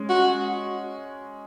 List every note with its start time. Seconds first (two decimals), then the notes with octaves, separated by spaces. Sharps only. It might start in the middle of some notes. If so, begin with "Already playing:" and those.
Already playing: G#3 C#4
0.10 F#4